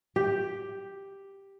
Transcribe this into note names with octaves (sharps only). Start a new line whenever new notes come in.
G4